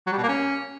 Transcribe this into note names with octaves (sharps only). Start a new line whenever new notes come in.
F#3
G3
B2
A#3
C#4